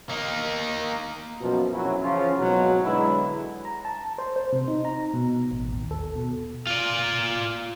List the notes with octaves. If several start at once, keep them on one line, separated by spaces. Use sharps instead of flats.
A#3 D#4
F#2 B2 F3
A#1 F#2 F#3 C#4 E4
C#3 E3 F3 C#4 F4
G#1 B2 F#3
B2 D3 F#3 G#3 B3 E4
A#5
A5
C5
C5
C3
D#4
A#5
B2
A1
D#2
A4
B2
F4 D5